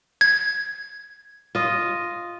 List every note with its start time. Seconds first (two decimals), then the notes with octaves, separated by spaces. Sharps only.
0.21 G#6
1.55 F4 D#5